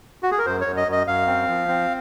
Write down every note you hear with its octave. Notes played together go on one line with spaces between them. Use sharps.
F#4
G#4
A#4
F#2 C5
C#5
F#2
D#5
F#2 D#5
F#2 F5
C4
F3
C4